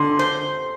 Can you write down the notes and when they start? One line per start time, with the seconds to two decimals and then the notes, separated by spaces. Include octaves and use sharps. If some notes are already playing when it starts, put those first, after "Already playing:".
Already playing: D3 C6
0.19 C5